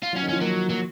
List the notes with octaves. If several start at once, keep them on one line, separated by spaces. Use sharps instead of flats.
F4
F#3
C#4
D#3
F3 C#4
F#3 A#3
F#3 A#3